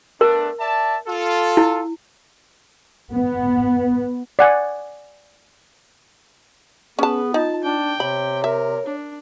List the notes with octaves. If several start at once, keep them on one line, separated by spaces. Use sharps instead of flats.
A3 B3 D4 A#4
D5 E5 A5
F4 A4
E4
B3
D5 F#5 G#5
B3 C#4 G#4 B4 A5
D#4 F4 A5
D4 G5
C3 C#5 B5
A#4 E5
D4